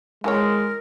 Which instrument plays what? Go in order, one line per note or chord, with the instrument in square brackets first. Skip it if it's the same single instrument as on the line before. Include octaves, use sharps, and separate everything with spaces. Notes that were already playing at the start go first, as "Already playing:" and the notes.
[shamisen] E3 A4 C#5 [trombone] G#3 [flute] A#4